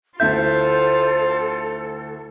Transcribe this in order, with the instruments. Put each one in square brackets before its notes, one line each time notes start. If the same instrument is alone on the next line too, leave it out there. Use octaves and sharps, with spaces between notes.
[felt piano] D2 E4 E5 [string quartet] F4 C5 [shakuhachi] A4 [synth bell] G6